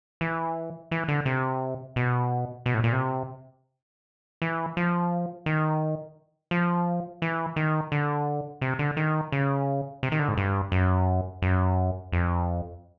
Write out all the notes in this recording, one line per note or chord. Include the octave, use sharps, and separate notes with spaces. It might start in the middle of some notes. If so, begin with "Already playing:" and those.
E3
E3
D3
C3
B2
B2
A2
A#2
C3
E3
F3
D#3
F3
E3
D#3
D3
C3
D3
D#3
C#3
C3
D#3
D3
G#2
G2
F#2
F#2
F2